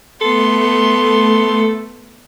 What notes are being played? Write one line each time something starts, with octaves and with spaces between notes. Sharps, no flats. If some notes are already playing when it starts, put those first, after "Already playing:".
A3 B3 A4 C6